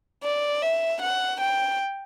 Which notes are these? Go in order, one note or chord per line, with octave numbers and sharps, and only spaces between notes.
D5
E5
F#5
G5